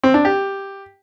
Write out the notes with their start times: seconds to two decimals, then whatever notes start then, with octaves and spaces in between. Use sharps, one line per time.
0.04 C4
0.14 D4
0.25 G4